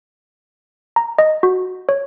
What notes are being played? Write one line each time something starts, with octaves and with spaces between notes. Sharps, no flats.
A#5
D#5
F#4
C#5